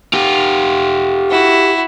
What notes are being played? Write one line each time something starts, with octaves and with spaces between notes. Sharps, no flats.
F4 G4
E4 F#4